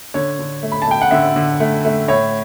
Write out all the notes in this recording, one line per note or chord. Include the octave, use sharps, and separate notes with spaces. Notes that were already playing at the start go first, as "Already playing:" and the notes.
D3 C#5
D3
A3
B5
A5
A3 G5
F#5
D3 E5
D3
A3
A3
A2 C#5